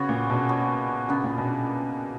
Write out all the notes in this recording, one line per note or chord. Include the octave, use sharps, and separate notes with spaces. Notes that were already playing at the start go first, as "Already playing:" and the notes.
Already playing: C#3 B3 F#4 C#5
A#2
B2
B3 F#4 C#5
C#3 B3 D4 A#4
A#2
B2